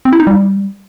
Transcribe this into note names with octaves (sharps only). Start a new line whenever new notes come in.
C4
E4
D#4
G3